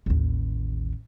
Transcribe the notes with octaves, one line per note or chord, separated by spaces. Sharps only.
A1 D#2